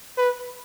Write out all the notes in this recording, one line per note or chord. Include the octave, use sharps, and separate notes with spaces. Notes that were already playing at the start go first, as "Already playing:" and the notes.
B4